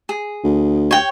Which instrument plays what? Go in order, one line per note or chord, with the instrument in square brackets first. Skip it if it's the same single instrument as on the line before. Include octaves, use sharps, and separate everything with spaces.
[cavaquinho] G#4
[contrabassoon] D2
[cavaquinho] C#5 G5